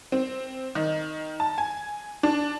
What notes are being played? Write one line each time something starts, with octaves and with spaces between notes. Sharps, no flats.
C4
D#3
A5
G#5
D4